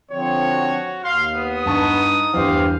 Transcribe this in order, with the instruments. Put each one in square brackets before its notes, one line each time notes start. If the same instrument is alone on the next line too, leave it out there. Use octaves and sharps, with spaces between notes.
[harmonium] D3 F3 C4 [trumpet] C#5
[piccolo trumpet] F#4
[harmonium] D#2 [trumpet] F5 [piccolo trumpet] C6
[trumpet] B3 [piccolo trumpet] D#6
[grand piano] G2 A5 C#6 [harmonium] D#4
[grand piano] E2 G2 [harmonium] G4 C5 [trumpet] F5